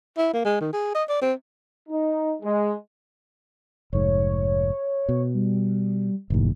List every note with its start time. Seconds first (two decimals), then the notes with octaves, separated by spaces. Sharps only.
0.17 E4
0.33 A#3
0.45 G#3
0.61 D#3
0.73 G#4
0.95 D#5
1.09 D5
1.22 C4
1.89 D#4
2.43 G#3
3.93 F1 G#2 C#5
5.09 B2
5.34 G3
6.30 F#1 D#2 A2